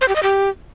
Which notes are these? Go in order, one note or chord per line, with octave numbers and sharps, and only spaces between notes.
C5
G4
D#5
G4